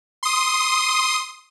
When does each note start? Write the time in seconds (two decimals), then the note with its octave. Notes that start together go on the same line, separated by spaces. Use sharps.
0.23 C6 D#6